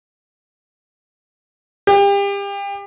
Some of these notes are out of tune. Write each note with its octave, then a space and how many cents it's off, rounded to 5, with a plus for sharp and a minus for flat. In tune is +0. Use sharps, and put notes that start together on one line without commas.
G4 +35